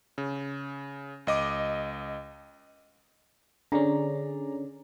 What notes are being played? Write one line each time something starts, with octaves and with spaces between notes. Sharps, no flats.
C#3
C#2 D#5 D6
D3 C#4 G#4 D5 A#5